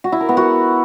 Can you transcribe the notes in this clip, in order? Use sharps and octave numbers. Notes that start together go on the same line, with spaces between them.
F#4
E4
A#4
B3
F#4